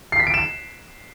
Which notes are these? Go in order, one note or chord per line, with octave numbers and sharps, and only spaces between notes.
C7
B6
D7
E7